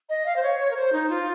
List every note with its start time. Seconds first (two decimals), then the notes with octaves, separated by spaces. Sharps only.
0.09 D#5
0.26 F5
0.36 C5
0.43 C#5
0.60 C#5
0.71 A#4
0.76 C5
0.93 D#4
1.10 F4